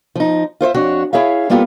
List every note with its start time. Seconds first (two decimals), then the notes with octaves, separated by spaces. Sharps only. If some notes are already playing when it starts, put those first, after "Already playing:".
0.16 F3 D#4
0.61 F4 C5 C#5 E5
0.74 F2 D4 F#4 C#5
1.13 E4 G#4 C#5 E5 F5
1.50 G3 A#3 B3 F4 G4 A4